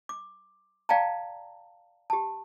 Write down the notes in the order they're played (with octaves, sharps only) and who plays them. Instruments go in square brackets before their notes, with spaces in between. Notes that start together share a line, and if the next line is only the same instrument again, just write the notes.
[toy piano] D6
D5 F5 G5 A5 A#5
G4 A5